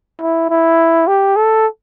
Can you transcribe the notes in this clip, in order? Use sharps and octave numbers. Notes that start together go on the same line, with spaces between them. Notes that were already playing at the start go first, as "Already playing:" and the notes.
E4
E4
G4
A4